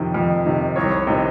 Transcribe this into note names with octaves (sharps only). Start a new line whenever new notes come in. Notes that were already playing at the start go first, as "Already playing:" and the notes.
Already playing: F2 C3 D#3 D#5
F2
C3 D#3
C2 C#5
C#5
C3 D#3 D#5